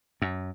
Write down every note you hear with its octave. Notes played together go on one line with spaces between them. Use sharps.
F#2